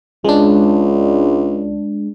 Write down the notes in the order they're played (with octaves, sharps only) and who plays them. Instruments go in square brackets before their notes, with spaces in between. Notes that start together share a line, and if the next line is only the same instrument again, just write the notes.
[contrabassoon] C#2 [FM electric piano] G#3 D4